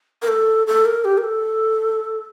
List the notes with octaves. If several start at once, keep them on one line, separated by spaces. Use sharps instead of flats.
A#4
A4
A4
A#4
G4
A#4
A4